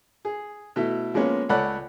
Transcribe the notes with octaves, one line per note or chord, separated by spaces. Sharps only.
G#4
B2 A3 E4
F3 G#3 A#3 B3 C#4
C#2 A4 C#5 D5 F#5 B5